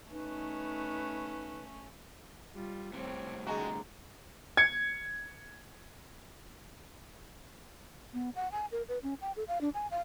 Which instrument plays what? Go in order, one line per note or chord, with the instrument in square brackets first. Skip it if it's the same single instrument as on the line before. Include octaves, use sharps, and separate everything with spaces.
[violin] A3 C#4 [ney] D#4 [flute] B4
[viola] G3 F4
[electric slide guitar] A2 C3 G3 [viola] C4 C#5
[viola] D3 G#4 [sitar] G#3 F#4 [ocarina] A#5
[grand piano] G#6 C#7
[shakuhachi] B3
F#5
G#5
A#4
B4
C#4
G5
A4
F5
D4
G#5
F5